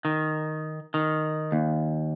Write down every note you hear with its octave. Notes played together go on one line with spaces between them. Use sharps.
D#3
D#3
D#2